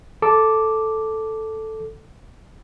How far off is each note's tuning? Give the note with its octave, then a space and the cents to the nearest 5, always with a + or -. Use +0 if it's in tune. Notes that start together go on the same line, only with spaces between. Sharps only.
A4 +0 D6 +0